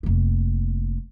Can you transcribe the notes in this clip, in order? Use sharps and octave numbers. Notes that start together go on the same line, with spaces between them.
F1 A#3